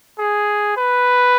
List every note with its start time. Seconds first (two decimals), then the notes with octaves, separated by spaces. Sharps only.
0.19 G#4
0.77 B4